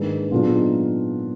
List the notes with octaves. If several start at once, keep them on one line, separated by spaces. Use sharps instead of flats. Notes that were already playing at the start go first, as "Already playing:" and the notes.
Already playing: G#2 D#3 A#3 D4 G#4 B4
A#2 F#3 B3 D4 F4 G#4
D#4